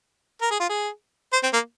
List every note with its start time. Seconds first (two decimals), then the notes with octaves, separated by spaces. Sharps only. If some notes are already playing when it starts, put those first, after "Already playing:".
0.42 A#4
0.51 G#4
0.60 F4
0.69 G#4
1.33 C5
1.43 C4
1.53 A#3